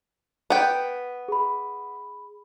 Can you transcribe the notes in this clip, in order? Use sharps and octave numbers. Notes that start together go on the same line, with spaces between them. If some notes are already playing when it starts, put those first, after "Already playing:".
B3 G5
G#4 B5